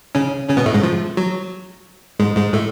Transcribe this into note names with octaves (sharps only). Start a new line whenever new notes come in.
C#3 C#4
C#3 C#4
B2 B3
A2 A3
G#2 G#3
F3
F#3
G#2 G#3
G#2 G#3
A2 A3